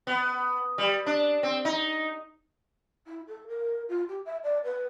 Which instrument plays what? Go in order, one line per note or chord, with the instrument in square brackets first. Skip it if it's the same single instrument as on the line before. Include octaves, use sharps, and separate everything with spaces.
[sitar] B3
G3
D4
C4
D#4
[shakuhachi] E4
A4
A#4
F4
G4
E5
D5
B4